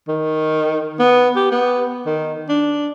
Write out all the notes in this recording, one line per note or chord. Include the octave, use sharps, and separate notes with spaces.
D#3
B3
G4
B3
D#3
D4